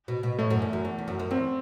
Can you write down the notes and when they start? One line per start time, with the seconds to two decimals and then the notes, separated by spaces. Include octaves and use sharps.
0.08 B2
0.23 B2
0.39 A2 A3
0.50 F#2
0.62 E2
0.73 F#2
0.85 E2
0.98 E2
1.08 F#2
1.19 F#2
1.31 E2 C4